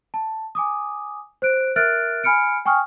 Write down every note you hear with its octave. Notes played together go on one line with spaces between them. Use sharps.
A5
G#5 D6 D#6
C5 F#6 D7
A#4 E5 F6 F#6 A6 D7
G#5 B5 F6 C#7 D7
G5 G#5 C#6 D#6 F6